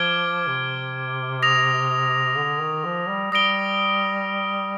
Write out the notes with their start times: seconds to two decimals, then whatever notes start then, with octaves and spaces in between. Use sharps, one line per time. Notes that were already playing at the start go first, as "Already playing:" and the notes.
Already playing: F3 D6 F6 G#6 D7 G7
0.48 C3
1.42 D#6 A#6 F7
2.37 D3
2.61 D#3
2.85 F3
3.09 G3
3.32 G3 D#6 A#6 D7 G7